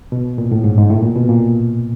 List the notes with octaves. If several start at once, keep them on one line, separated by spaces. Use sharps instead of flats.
B2
A#2
A2
G#2
G#2
A2
A#2
B2
A#2